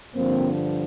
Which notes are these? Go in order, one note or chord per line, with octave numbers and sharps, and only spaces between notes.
G2 D3 F3 A#3 C4